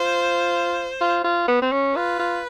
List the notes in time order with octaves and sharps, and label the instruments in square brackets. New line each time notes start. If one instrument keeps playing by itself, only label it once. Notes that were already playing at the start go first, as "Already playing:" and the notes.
Already playing: [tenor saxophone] F4 [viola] C5
[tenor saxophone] F4
F4
B3
C4
C#4
[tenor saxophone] F4 [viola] B4
[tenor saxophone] F4